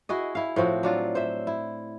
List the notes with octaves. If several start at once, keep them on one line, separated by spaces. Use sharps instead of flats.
E4 F#4 G#4 D#5
E4 F5
A2 F3 C4 F#4
F#3 D4 F4
C5 E5
E4